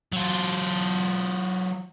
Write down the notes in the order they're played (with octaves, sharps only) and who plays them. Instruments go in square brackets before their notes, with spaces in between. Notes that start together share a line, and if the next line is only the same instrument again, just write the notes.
[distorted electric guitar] F#3 F4